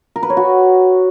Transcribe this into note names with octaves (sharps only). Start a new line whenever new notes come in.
A#4
B4
C#5
F#4